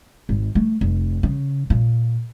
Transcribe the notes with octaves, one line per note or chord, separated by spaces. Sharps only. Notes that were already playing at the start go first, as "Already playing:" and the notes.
G#1
A3
F1
C#3
A#2